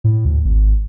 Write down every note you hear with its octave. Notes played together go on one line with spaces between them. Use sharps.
A2
D2
G#1